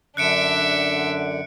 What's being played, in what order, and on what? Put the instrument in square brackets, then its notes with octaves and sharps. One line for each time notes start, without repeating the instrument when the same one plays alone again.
[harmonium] F#2 D3 [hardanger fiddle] D4 E5 [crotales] F#6 C#7 D7